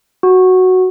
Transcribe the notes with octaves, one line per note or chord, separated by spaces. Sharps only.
F#4